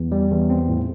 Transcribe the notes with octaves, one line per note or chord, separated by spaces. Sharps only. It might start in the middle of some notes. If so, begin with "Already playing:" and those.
Already playing: E2
G3
E2
C4
A2